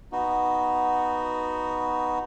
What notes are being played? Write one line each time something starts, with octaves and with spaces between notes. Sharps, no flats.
B3 D#4 F#4